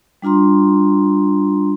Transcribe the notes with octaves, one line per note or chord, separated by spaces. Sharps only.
G3 D4 F4 A#5 C6